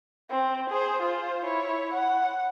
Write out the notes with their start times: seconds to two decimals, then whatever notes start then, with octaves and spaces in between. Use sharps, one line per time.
0.30 C4
0.70 G#4 C5
1.02 F4 C5
1.44 E4 C#5
1.93 F#5